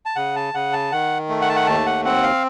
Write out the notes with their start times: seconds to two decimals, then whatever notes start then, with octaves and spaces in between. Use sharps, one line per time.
0.06 A5
0.16 C#3 F#5
0.36 A5
0.54 C#3 F#5
0.73 A5
0.92 D#3 F#5
1.29 A3
1.42 F#5
1.49 A5
1.56 F#5
1.67 D#2 A5
1.86 F#5
2.05 C4 F#5
2.23 F5